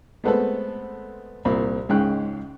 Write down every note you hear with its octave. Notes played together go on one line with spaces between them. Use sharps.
G#3 A3 B3 C4 A4 B4
C2 A#2 C4 B5
C#2 G#2 G#3 C#4 G5 F#6